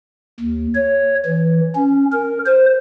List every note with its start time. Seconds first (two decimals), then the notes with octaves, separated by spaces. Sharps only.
0.40 D#2
0.75 C#5
1.26 E3
1.75 C#4
2.12 A#4
2.46 C5